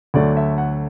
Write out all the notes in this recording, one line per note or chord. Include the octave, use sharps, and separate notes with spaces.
D2 D3 F#3 A3 D5
E5
F#5